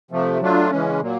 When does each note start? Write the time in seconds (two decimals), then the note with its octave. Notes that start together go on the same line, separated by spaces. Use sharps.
0.11 C3 F3 A3
0.41 F#3 A3 D4 F4
0.71 C#3 E3 G#3 C#4
1.00 A#2 F#3 A#3